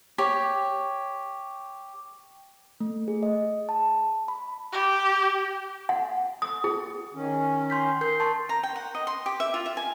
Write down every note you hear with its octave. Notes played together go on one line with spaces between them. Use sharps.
G4 C#5
A3
G#4
D#5
A5
B5
G4
F#5
D#6
G#4
D#3 C#4
C6 G6 B6
A#4 G6 C7
A5 C6 C#6
A#5
G5
F#5
D#5
C6
G4
E5
F4
E5
G#5